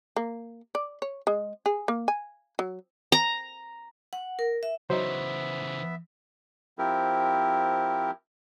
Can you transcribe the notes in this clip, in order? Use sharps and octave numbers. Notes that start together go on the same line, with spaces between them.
A#3
D5
C#5
G#3
G#4
A#3
G#5
F#3
A#5
F#5
A#4
E5
C#3 E3 F#3 B3 D#4 C5 E5
F3 C4 E4 G4 A#4